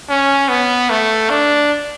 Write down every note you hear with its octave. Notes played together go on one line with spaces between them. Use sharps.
C#4
B3
A3
D4